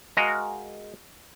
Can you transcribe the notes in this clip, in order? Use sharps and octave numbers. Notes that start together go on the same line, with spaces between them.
G#3 F#4 G#4 A#4 D#5 F5